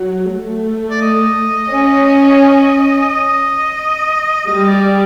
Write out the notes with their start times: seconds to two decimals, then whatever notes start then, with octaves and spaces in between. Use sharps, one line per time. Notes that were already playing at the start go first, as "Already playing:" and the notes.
Already playing: F#3
0.32 A3
0.90 D5
1.01 D#5
1.71 C#4
3.09 D#5
4.47 G3 D#5
4.69 D5